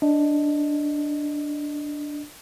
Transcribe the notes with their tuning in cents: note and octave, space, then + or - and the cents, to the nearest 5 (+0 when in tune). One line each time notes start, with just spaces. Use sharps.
D4 +0 D#5 +0